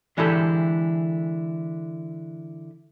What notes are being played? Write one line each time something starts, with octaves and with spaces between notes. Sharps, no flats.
D3 E3 G#3 E4 G4 A4